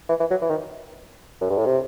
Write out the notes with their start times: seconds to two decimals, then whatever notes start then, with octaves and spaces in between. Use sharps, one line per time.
0.09 E3
0.20 E3
0.30 F#3
0.42 E3
0.50 D#3
1.41 F#2
1.50 G2
1.58 A2
1.66 C3